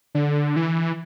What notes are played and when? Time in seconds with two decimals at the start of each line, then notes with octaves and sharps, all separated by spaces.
0.15 D3
0.56 E3